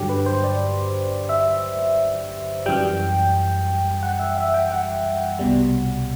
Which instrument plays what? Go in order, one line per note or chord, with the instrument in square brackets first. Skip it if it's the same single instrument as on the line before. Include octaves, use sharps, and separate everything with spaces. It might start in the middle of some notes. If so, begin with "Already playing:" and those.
Already playing: [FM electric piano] G2 D3 F#3 G4
B4
C5
D5
E5
F#2 E3 G3 G5
F#5
E5
E5
G5
F#5
C2 B2 G3